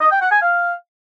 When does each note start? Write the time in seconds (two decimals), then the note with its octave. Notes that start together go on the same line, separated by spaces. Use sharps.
0.01 D#5
0.11 G5
0.21 F#5
0.32 G#5
0.42 F5